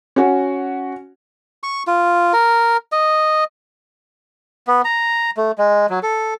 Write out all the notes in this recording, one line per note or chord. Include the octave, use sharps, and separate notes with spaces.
C#4 F#4
C#6
F4
A#4
D#5
B3
A#5
A3
G#3
F#3
A4